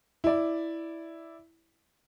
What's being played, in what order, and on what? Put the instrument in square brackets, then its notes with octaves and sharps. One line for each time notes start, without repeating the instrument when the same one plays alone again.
[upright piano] E4 D5